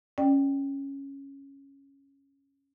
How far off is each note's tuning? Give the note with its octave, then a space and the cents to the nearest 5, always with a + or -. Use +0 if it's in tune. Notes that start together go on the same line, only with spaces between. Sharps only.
C#4 -5 D5 +25 G5 +0